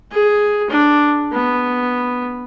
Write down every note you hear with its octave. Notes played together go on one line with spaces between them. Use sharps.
G#4
D4
B3